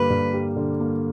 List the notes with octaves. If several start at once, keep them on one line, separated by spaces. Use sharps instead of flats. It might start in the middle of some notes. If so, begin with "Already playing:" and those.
Already playing: G2 D3 G3 A#3 B4
G2
G3
D3
A#3